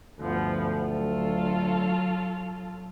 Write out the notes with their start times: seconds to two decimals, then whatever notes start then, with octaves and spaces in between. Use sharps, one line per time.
0.19 D2 G2 F3 B3
0.83 F#3 F4 A4